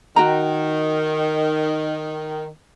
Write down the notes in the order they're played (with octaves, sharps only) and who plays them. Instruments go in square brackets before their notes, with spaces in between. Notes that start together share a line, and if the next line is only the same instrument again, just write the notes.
[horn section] D#3 [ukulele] F#4 G5 A#5